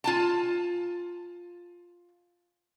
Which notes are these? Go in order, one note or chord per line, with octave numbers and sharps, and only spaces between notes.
F4 G#5 A5